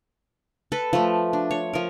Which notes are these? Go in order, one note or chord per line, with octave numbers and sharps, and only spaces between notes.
A4 B4
F3 A3
D4
C#5
F3 A#4